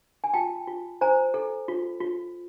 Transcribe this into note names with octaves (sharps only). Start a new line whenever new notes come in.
G#5
F4 G5 A5
F4
C5 G#5 A#5
A4
F4
F4